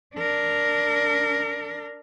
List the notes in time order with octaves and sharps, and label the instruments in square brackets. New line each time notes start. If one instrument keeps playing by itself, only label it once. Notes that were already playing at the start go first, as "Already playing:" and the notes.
[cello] D4 A#4